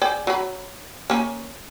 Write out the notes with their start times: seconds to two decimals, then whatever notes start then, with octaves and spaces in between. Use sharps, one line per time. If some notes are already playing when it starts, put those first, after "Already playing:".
0.02 G#4 D5 G5
0.27 F#3 B5
1.10 A#3 C#4